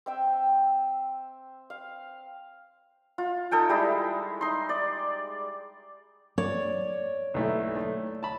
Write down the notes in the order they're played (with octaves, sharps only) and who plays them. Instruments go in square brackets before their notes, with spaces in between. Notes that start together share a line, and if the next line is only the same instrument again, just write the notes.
[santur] C4 E5 G5
F5
F4
D#4 A4 G5 G#5
G3 G#3 E4
D#4 C6
D5
[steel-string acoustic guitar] C#5 D5
[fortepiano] B1 A3 E4
A3
A5 B5